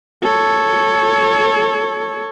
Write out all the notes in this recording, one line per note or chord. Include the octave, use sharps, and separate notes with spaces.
A4 C#5